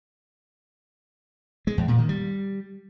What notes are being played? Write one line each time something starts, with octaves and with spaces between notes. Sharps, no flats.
G#3
E2
A#2
D#3
G3